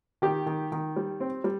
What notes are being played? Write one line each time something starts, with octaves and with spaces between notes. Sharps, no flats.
D#3 G4
D#3
D#3
G3
C4
G3